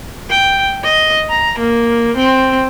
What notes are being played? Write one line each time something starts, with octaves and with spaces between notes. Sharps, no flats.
G5
D#5
A#5
A#3
C4